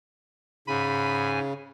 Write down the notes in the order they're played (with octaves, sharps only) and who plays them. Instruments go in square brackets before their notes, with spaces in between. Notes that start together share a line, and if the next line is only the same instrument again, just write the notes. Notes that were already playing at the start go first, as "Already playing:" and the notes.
[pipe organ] G#2 G#5 [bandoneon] C#3 [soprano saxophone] B5